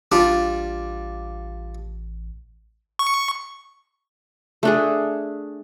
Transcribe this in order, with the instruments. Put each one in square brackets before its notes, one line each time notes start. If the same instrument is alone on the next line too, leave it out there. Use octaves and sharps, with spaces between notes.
[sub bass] A1 [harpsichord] G3 D4 F4
[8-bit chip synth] C#6
[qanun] A3 D4 G#4